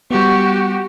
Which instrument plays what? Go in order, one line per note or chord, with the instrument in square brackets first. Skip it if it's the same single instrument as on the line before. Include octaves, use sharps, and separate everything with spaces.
[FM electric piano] G3 B3 [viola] F#4 G4